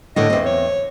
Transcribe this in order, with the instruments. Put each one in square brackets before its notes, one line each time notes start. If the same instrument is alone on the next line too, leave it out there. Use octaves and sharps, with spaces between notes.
[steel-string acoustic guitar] A2 D3 [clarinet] D#5
[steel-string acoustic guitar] E2 C4
[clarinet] C#5